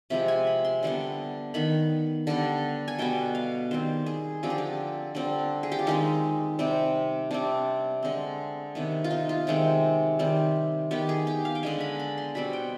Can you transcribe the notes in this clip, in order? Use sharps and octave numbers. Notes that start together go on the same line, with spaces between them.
C3 F3 G#3 B5
G#5
B5
C6
D3 G3 B3
D#3 B3 B5
D3 G3 B3
G#5
B2 G3 B3 G5
F5
D#3 G3 C4 C5
G#4
D3 F3 C4 G4
G#4
G4
D3 G3 C4
G#4
G4
F4
D#3 G#3 C4 D#4
C3 G3 C4
C3 G3 C4 D4
D3 G#3 C4
C3 D#3 B3
F4
D#4
F4
C3 D#3 G#3 C4
D#3 G3 C4
D#3 B3 G4
G#4
G4
F5
G5
D3 G#3 B3 G#5
B5
B5
C6
B2 G3 C4 B5
G5